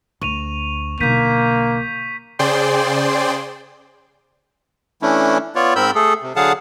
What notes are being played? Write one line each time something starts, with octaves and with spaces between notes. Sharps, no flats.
D2 C#6 D#7 F7
B1 D3 A#3 G6 B6 D#7
C#3 G#4 C5 D5 G5 C6
E3 A3 C#4 D4 E4
B3 F4 C#5 D5
G#2 C4 A#4 B5 E6 G6
A3 G#4 A4
C3
D3 F#3 G#4 F5 F#5 A5